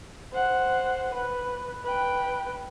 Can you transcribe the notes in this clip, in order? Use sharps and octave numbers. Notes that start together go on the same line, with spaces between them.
C5 F#5
B4
B4 G5